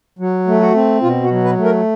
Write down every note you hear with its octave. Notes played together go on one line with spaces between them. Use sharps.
F#3
A3
F#4
C4
B2 F4
F#4
F#3
B4
A3
A#4